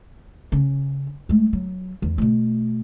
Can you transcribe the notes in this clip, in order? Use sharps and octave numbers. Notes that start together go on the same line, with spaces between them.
C#3 C#4
G#3 A3
F#3
E2
B2 A3